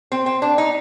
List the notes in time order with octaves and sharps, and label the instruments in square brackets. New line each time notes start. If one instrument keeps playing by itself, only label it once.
[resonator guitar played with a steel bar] C4
C4
D4
D#4